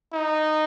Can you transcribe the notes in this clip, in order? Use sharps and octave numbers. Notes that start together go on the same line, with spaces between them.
D#4